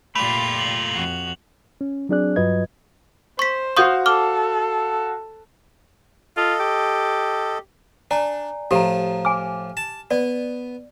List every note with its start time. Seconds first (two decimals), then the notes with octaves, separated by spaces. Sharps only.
0.15 A#2 A3 F4 G4 D5 B5 F7
0.59 F#7
0.92 F2 F#4
1.81 C#4
2.09 F#3 C4 D4 G#4 D5 F#6
2.36 G2 F#3 F4 B4 D#5 G#6
3.39 C5 C#6 B6
3.77 F#4 F5 C#6 D#6 G6
4.06 A4 D6 F6
6.37 F4 A4 D#5
6.60 G4
8.11 D4 D5 G#5 A#5
8.71 A2 F3 G4 A#5 D#6
9.25 G#5 D6 F6
9.77 A5
10.11 B3 D5